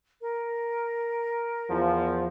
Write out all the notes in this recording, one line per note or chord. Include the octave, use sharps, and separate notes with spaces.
A#4
E2 F3